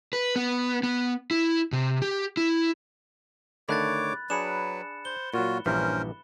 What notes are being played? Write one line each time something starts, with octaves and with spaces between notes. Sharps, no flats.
B4
B3
B3
E4
C3
G4
E4
D3 D#3 A3 C#5 B5 D6 F#6 A6
F#3 D4 G#4 B4 B5 C#7 E7
C5 G7
A#2 F#3 F4 F#4
A#1 G2 E3 C#4 A#4 C5